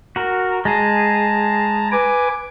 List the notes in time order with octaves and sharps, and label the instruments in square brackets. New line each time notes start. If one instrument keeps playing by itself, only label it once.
[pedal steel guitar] F#4 A#4
[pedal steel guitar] G#3 G#4 [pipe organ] A5 A#5
[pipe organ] B4 G#5 D6